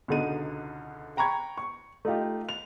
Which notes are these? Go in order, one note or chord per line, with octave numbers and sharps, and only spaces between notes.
C#2 B2 D3 D#4 D#7
G5 A#5 B5 C#6 G#6
C#6
A3 D#4 F4 G4
F7